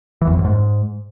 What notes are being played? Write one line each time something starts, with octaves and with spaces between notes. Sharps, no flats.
E3
E2
F2
F#2
G#2